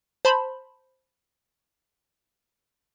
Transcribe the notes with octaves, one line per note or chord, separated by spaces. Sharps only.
C5 A5 B5 C6